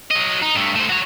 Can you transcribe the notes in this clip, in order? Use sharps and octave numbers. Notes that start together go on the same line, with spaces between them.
F#3 D#5
D#4
G2 A3
A3 C5
F#4 C#5